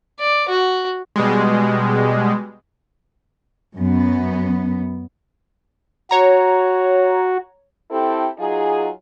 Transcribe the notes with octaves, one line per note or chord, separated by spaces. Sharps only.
D5
F#4
B2 G3 G#3
F#2 B3
F#4 C#5 A#5
C4 E4 G4 A4
F#3 D#4 F4 G#4